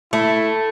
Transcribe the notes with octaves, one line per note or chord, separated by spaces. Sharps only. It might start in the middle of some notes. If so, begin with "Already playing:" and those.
A3 E4